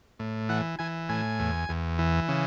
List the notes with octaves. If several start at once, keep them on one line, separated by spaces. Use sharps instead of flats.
A2
E3 F#5
E3 G#5
A2 G#5
E2
E2
E3
C#3